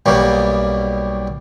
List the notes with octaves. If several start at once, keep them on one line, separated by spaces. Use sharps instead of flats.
B1 B2 G3 A#3